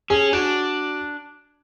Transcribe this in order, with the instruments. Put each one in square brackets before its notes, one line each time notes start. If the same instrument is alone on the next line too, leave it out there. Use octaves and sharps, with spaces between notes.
[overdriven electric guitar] C#4 [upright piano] G#4
[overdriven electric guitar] D4 [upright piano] F#4